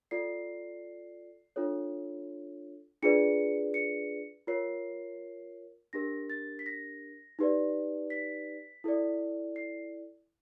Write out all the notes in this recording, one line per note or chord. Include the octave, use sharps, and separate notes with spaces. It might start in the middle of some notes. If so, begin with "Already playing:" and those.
F4 A4 D5 C7
D4 F4 A4 C#5
D4 F4 G#4 B4 D5 C#7
C#7
F4 A#4 C#5 C7
D4 G4 A#4 A#6
A6
B6
A#6
D#4 G4 B4 D5
B6
E4 A4 D5
C7